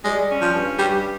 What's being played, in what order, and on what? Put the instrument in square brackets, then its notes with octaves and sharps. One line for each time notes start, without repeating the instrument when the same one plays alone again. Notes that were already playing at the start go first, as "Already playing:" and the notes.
[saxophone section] G3 [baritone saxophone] G#3
[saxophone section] C#4
[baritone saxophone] F3
[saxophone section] G2
[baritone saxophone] G3 [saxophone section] G4